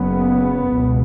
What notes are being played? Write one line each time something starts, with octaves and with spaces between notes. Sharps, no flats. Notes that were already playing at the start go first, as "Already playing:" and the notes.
Already playing: F#1 F#2 C#3 B3
C#2 B2